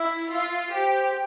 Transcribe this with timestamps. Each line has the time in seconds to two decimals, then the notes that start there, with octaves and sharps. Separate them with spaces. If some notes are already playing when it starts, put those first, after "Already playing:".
Already playing: E4 E5
0.31 F4
0.73 G4 C5